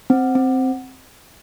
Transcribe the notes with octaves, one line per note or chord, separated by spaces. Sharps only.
C4
C4